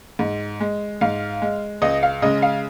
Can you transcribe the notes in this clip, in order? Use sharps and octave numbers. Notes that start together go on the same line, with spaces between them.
G#2
G#3
G#2 F5
G#3
C#2 D#5
F5
C#3 G#3 D#5
F5